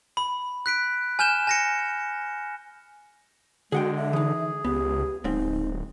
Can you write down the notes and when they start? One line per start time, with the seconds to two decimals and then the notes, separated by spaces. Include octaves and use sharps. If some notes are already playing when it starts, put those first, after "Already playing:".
0.17 B5
0.66 F#6 B6 D7
1.19 G#5 F6 G6 E7 G7
1.47 G#5 A#6 C#7
3.72 D3 G#3 F#4 G#4 F#5 G5
3.97 E5
4.13 E3 D#4 G#4
4.65 C#2 B3 G4
5.24 D1 G#2 C4 D#4